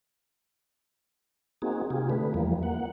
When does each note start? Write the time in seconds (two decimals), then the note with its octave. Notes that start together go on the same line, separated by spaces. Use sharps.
1.62 A#3 C4 D#4 F#4 G#4
1.90 C3 F4 G4 G#4
2.10 D3 A3 B4
2.34 E2 E3 F3 G3 A#3
2.63 A#3 F#5